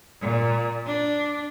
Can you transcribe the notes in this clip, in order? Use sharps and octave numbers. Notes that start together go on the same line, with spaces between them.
A#2
D4